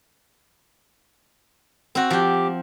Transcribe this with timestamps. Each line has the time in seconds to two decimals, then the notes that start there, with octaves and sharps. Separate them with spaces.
1.95 C4 F#4
2.10 F3 G4 G5